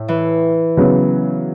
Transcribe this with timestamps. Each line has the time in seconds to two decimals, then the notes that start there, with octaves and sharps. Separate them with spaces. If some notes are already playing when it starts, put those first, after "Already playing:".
Already playing: A2
0.08 E3
0.77 C#3 F#3 B3